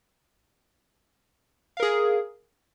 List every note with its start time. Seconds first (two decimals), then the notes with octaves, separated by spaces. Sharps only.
1.77 F5
1.80 A#4
1.82 G#4